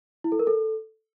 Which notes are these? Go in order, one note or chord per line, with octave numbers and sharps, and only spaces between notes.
E4
A4
A#4
A4